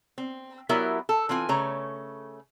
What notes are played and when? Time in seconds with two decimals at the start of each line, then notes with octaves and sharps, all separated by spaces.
0.18 C4
0.69 F#3 B3 E4 G4 A#4 E5
1.09 A4
1.29 E3 C4 F4 G#5
1.49 C#3 A3 C#5 A#5